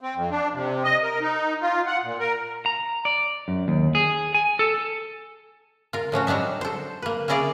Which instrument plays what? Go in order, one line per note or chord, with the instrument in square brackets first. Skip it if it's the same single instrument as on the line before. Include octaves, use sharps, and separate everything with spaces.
[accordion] C4
F2
D4
C3
D#5
A#4
D#4
F4
F#5
A#2
A#4
[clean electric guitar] A#5
D5
F#2
D#2
G#4
G#5
A4
[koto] F4 A#4
A2 F3 C#4 F#4
F#3 G3 D4 D#4 E5
A4 C5
A#3 B4
A#3 C#4 E4 G#4 D5 F5